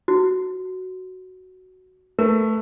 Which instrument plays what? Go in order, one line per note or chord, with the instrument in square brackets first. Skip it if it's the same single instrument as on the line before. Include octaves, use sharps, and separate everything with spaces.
[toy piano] F#4
[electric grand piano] A3 B4 [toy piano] A#4